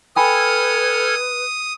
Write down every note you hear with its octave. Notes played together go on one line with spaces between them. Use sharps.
A4 B4 G5 G#5 B5 D#6 F6 G#6